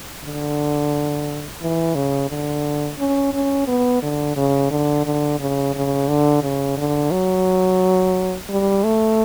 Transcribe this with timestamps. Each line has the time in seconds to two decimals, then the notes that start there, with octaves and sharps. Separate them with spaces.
0.24 D3
1.62 E3
1.95 C#3
2.30 D3
2.99 C#4
3.33 C#4
3.68 B3
4.03 D3
4.37 C#3
4.71 D3
5.06 D3
5.40 C#3
5.75 C#3
6.08 D3
6.43 C#3
6.78 D3
7.12 F#3
8.50 G3
8.84 A3